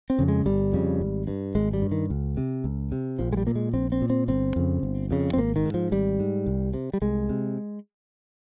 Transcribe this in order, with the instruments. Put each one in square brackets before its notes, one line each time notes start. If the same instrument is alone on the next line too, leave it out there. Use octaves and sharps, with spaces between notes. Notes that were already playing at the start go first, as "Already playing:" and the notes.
[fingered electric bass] C4
F2 C#3
G#3
G1 G3
F2 C#3
G#1
G2
G#1 G#3
G3
G2
D#3
C#2
C3
C#2
C3
A#1 F3
G#3
G3
A#2 A#3
G#3
A#1 C4
C4
A#2
C4
G1 C4
F2 C#3
G1
F2 C#3
C4
G#1 A#3
D#3
G#2
F3
G#1 G3
G#2
C2
C3
G3
C2 G#3
C3